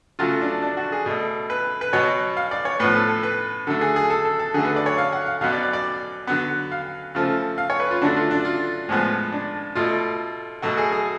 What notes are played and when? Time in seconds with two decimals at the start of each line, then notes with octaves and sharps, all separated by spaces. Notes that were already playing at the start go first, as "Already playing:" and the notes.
0.19 C#3 F#3 A3 F4
0.41 D4
0.62 D4
0.77 F#4
0.92 G#4
1.06 B2 A3
1.50 B4
1.81 B4
1.93 B2 F#3 B3 C#5
2.37 F5
2.51 D5
2.65 C#5
2.80 A2 F3 B3 B4
2.95 A4
3.23 B4
3.67 D3 F#3 A3 A4
3.81 G#4
3.96 G#4
4.10 A4
4.25 A4
4.39 A4
4.54 D3 F#3 A3 G#4
4.65 B4
4.76 D5
4.86 C#5
4.98 F5
5.13 F#5
5.26 F5
5.41 B2 F#3 B3 F5
5.52 D5
5.63 D5
5.73 D5
6.27 D3 F#3 B3
6.72 F5
7.15 C#3 F3 A3
7.58 F5
7.70 C#5
7.80 B4
7.91 F4
8.02 D3 F#3 A3 D4
8.16 F4
8.31 D4
8.45 F4
8.89 A2 F3 G#3 B3
9.32 D4
9.75 B2 A3 F4
10.62 B2 F#3 A3 F#4
10.78 G#4
10.92 G#4